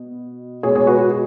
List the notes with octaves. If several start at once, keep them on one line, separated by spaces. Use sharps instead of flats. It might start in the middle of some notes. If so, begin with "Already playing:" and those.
Already playing: B2
B2 G#3 G#4 C#5
G#4 C#5
F#4 B4
F#4
G#4